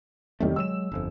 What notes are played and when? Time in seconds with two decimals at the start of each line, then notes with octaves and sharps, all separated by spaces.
0.40 E2 C3 D#3 F#3 G3 A3
0.56 F#3 G#3 E6 E7
0.92 G1 F2